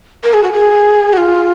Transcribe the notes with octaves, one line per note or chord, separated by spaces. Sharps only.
A#4
G#4
F#4
G#4
F#4
F4